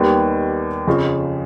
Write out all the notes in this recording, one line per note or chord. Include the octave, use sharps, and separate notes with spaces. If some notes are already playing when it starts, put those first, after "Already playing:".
Already playing: D#2 D#3 G3 B3
F2 C#3 F3